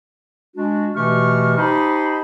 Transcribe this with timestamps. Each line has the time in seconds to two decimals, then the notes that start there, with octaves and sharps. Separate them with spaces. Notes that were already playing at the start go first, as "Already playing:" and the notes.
0.56 G#3 D4 F#4
0.94 B2 E3 A3 G4 C#6 F6
1.56 D#4 G4 C5 D#5 A5 B5